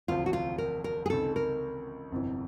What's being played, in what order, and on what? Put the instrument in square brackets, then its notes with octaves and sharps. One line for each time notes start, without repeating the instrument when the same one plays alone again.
[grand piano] E1 D2 C3 F3 [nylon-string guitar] F4
[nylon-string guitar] F#4
F4
A#4
A#4
G#4
[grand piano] C#2 C3 D#3 [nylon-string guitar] A4
[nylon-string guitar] A#4
[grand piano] G1 F2 C3 E3